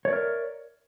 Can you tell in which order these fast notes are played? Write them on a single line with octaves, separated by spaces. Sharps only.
C#5 D5 E5 A#4